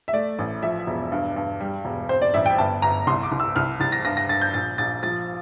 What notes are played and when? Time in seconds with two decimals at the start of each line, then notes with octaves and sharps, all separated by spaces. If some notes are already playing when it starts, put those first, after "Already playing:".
0.08 E5
0.13 A3 D5
0.38 A1
0.63 F3 E5
0.87 E1
1.12 G2
1.36 G2
1.60 G3
1.85 E1
2.09 C4 C5
2.22 D5
2.34 A1 E5
2.46 G5
2.58 G1 A5
2.82 G1 A#5
3.07 C2 C6
3.23 D6
3.32 C2
3.40 E6
3.56 C2 F6
3.80 C2 A6
3.92 A#6
4.05 G2 A#6
4.17 A#6
4.29 G2 A6
4.42 G6
4.54 A#1 A6
4.78 A#1 A6
5.03 F3 A6